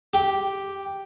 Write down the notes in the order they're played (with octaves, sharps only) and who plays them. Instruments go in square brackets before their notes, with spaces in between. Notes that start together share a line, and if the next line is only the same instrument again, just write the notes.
[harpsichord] G4